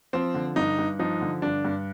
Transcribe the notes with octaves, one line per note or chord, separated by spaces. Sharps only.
F3 C4
D3
G2 D#4
G2
F3 D#4
D3
G2 D4
G2